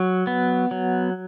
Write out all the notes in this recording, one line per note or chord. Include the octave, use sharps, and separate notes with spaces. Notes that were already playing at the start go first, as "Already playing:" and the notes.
Already playing: F#3
B3
F#3